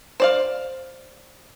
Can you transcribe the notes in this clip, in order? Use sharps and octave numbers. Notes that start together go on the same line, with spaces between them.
C5 D5 F5